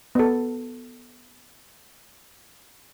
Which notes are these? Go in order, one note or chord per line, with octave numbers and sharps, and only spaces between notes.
B3 A4